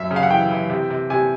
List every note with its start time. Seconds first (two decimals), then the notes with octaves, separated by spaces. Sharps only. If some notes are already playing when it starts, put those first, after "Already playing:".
Already playing: F#2 E5
0.11 C#3
0.16 F5
0.23 F#5
0.30 E3 G5
0.51 E3
0.70 C3
0.90 C3
1.10 C3 G#5